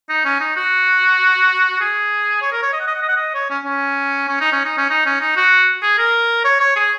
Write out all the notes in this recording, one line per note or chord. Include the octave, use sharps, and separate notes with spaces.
D#4
C#4
D#4
F#4
G#4
C#5
A#4
C#5
D#5
F#5
D#5
F#5
D#5
F#5
D#5
C#5
C#4
C#4
C#4
D#4
C#4
D#4
C#4
D#4
C#4
D#4
F#4
G#4
A#4
C#5
C#5
G#4